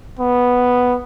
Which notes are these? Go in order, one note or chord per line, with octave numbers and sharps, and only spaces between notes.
B3